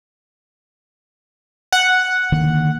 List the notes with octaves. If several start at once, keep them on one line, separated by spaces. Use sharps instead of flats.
F#5
D3 D#3 A#3